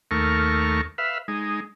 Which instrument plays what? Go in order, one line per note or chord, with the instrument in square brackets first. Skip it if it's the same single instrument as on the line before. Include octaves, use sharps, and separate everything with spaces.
[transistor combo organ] D#2 A3 A#4 C#6 F6
B4 E5 F5
G#3 D#4